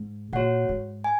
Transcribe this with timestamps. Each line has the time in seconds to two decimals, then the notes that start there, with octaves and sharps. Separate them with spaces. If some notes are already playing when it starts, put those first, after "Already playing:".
Already playing: G#2
0.33 A#2 F#4 C#5 F#5
0.69 G#2
1.04 G#5